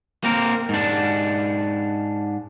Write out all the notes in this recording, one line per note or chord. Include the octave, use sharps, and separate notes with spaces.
A#3 C4 A#4
G#2 D4